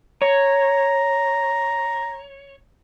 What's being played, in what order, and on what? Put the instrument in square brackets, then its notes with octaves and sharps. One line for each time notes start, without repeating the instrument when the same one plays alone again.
[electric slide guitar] C#5 [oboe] A#5